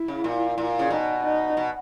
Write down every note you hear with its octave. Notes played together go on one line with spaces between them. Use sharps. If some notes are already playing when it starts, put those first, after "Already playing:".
Already playing: E4
C#3
A#2
A#2
C#3
B2 D#4
D#4
B2